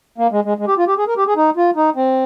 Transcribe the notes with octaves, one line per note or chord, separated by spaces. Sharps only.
A#3
G#3
G#3
G#3
G4
F4
G4
G#4
A#4
G4
G#4
D#4
F4
D#4
C4